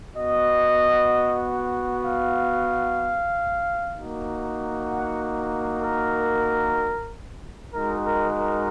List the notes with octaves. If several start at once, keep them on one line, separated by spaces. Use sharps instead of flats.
B3 F#4 D#5
F5
A#3 D#4 F#4
F#5
A#4
G#3 D#4 F#4 A#4
A#4
A#4